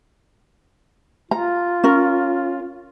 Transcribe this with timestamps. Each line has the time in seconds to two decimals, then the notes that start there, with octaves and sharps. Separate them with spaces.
1.31 F4 A#5
1.84 C#4 A#4